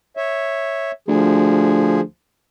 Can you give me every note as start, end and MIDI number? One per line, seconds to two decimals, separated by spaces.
0.17 0.91 73
0.17 0.91 76
1.08 2.00 38
1.08 2.01 53
1.08 2.01 68